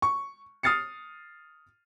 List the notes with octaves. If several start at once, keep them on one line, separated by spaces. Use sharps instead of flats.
C#6
D#6 F6 A6 C7 C#7